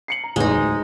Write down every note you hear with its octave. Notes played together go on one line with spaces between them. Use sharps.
C7 C#7 F#7
A#5
A1 E2 G#3 D#4
D1